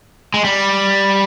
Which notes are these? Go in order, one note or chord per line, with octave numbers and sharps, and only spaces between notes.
G#3
G3